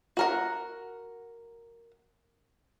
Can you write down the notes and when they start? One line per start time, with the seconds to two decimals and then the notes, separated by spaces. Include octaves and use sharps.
0.17 F#4 A#4 F#5